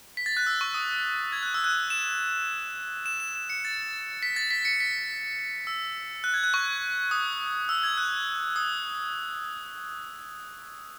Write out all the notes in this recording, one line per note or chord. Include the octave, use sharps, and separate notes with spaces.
B6
A6
F#6
E6
C#6
D#6
G#6
F#6
E6
F#6
E7
E7
E7
E7
C#7
A6
B6
A6
B6
C#7
B6
E6
F#6
G#6
F#6
C#6
D#6
E6
G#6
F#6
D#6